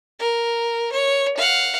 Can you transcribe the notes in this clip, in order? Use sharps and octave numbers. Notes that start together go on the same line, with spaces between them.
A#4
C#5
F5 F#5